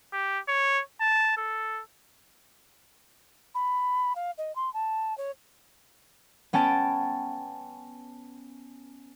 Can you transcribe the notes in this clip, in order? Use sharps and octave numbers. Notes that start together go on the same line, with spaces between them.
G4
C#5
A5
A4
B5
F5
D#5
C6
A5
C#5
B3 C#4 G5 A5 A6 D7